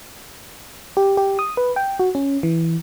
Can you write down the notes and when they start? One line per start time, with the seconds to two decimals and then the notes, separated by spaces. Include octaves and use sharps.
0.97 G4
1.17 G4
1.39 D#6
1.57 B4
1.76 G5
1.99 F#4
2.15 C#4
2.43 E3